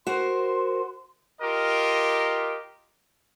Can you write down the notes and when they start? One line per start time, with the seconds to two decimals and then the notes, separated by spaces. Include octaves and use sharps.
0.07 F#4 A#4 C5 C6
1.41 F4 G4 A#4 D#5